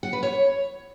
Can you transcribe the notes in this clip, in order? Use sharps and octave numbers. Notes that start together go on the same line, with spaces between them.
F#5
B4
C#5